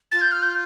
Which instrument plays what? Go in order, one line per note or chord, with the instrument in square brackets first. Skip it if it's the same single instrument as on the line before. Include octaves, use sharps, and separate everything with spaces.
[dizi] F4 [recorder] A6
[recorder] G6
F6
G6